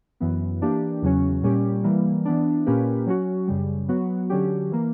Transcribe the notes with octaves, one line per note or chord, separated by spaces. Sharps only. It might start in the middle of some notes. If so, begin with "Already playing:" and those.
F#2 E3 B3
E3 A#3 D4 G4
E2 C#3 F#3 C#4 F#4
A#2 G3 C#4 G4
E3 G3 A#3
E3 B3 D4
A#2 A#3 C#4 G4 B4
F#3 C#4 F#4
F#2 C#3 G3
F#3 B3 F#4
D3 F#3 C#4 G4
E3 A#3